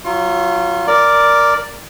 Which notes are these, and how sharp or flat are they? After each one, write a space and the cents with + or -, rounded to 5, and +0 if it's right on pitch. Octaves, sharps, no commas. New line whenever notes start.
F#3 +0 F4 -25 C6 +45
A#4 +0 D5 +0